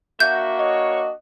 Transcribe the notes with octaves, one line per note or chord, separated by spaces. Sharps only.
A#3 D4 F#4 E5 G6
C#5 D#5